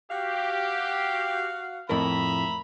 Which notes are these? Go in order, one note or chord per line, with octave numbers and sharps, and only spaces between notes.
F#4 G4 F5
F2 A2 A#4 E5 A#5 B5